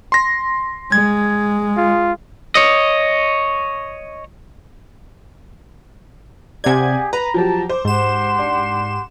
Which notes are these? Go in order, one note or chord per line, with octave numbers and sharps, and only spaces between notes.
C6 A#6
G#3 G#6
F4
C#5 D#5
C3 G4 G#4 D5 F#5 G#5 G#6
B4 A#5 B5
F3 F#3 G4 G5 A5
C5 D6
G#2 G4 F#5 C6 E7
D4